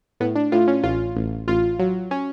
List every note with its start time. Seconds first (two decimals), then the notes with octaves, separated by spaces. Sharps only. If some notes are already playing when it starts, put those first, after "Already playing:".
0.20 A2 B3
0.36 D4
0.52 A2 F4
0.68 C#4
0.83 A1 F4
1.16 A1
1.48 A1 F4
1.79 F#3
2.11 C#4